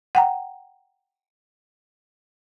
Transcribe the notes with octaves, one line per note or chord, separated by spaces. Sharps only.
F#5 G5 A#5